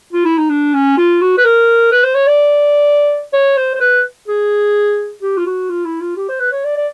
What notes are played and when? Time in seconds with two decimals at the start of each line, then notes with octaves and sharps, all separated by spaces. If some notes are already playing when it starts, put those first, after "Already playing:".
0.13 F4
0.25 E4
0.38 D#4
0.50 D4
0.74 C#4
0.97 F4
1.21 F#4
1.38 B4
1.44 A#4
1.92 B4
2.04 C5
2.15 C#5
2.27 D5
3.33 C#5
3.57 C5
3.75 C5
3.80 B4
4.28 G#4
5.22 G4
5.37 F4
5.46 F#4
5.69 F4
5.85 E4
6.01 F4
6.16 G4
6.29 C5
6.40 B4
6.52 C#5
6.64 D5
6.76 D5